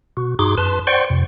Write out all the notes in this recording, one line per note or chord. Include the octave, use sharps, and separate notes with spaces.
B2 F#4
G2 D#4 F#4 G#4 C6 D6
F#2 B4 A5 C6
C5 D5 F#5 G5 C6 C#6
F2 C3